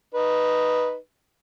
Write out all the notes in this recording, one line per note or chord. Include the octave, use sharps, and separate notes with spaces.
D#4 B4